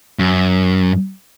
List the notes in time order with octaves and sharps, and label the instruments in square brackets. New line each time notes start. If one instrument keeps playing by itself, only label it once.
[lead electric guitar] F#2